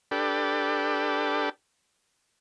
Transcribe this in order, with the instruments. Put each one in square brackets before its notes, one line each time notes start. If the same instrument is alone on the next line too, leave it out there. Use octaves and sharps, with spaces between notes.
[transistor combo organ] D4 G4 A4 B4